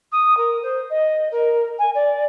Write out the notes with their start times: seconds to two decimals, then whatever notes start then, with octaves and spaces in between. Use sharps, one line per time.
0.12 D#6
0.37 A#4
0.63 C5
0.90 D#5
1.31 A#4
1.79 G#5
1.94 D5